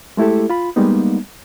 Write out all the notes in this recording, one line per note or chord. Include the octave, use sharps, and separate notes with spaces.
G#3 A3 E4 G4 A4
F4 B5
G3 G#3 A#3 B3 D#4